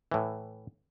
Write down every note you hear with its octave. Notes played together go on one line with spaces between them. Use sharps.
A2 E3